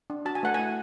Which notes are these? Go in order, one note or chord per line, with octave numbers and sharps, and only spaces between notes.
D4
F#4 A5
G#5
A3 F#5
E4 G#5